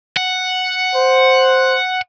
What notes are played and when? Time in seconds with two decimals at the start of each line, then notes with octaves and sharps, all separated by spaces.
0.17 F#5
0.95 C5